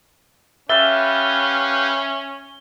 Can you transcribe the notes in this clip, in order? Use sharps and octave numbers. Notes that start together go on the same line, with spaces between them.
C#4 G4 B4 E5 F5 E6 A6 G7